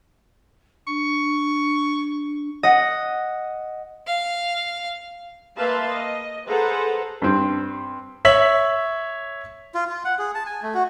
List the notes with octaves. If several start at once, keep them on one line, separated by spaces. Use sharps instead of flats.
D4 C#6
D#5 F#5
F5
A#3 B4 E5 F5 A5 C6
D#5
G#4 A4 B4 C5 F#5 A#5
G2 C4
C#5 E5 B6 F#7
F4
F4
F#5
G#4
A5
G#5
A3
F#4